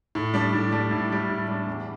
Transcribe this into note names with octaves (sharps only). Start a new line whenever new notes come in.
A2
G3 D4
A2
G3 D4
A2
G3 D4
A2
G3 D4
E2